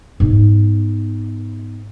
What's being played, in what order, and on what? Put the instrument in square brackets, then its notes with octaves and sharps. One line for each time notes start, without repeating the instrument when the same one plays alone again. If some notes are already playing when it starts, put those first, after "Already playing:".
[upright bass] G#2 B3